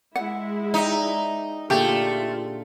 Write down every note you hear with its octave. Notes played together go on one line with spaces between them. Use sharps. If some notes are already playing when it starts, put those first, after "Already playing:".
G#3 E4 F#5
D#4 D5 E5 G5
A#2 D3 A3 F4 G4 G#4